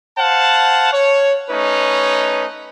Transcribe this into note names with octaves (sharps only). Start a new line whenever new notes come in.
C5 F5 F#5 A5
C#5
A3 C#4 D#4 B4 C#5